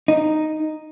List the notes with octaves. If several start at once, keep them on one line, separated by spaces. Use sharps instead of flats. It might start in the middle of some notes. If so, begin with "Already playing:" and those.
D#4